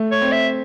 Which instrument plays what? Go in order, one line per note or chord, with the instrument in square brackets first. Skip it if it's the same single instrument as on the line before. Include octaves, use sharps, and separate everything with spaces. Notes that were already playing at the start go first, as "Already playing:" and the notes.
Already playing: [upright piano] A3
[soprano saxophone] C#5
[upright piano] C4
[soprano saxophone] E5